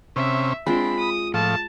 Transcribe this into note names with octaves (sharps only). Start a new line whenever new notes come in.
C3 C#4 E5
G#3 C4 D4 F4 B5
D#6
A2 F3 A5